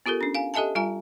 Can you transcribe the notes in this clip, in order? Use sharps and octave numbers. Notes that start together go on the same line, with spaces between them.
B3 F4 G4 A4 A#4
C#4 D4
F5 G#5
G4 A4 D#5 E5 G#5 A5
G3 F4 G#5 A#5